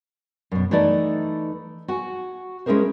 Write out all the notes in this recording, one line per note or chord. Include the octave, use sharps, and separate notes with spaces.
F#2 B2
E3 A3 D#4 B4 D5 D#5
F#4 F#5 G#5
G#3 C#4 E4 G#4 A#4 C5